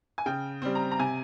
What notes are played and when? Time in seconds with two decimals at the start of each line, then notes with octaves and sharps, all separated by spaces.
0.18 G#5
0.26 C#3 G5
0.62 G3 C4
0.75 A#5
0.92 A#5
0.99 C3 G#5